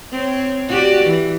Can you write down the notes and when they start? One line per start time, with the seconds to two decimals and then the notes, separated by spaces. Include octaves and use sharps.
0.12 C4 C#5
0.69 F#4 G4 D5
1.04 E3